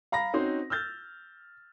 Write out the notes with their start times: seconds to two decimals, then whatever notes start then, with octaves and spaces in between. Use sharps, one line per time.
0.12 F5 A#5 B5 A#6
0.33 C4 C#4 D#4 F#4 C5
0.70 E6 F6 G6 A6